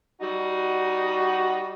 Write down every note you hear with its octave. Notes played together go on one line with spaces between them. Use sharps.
G3 D#4 F#4